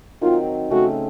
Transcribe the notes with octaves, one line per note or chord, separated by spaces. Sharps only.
D#3 F#3 C4 F4
C#3 A3 C4 F#4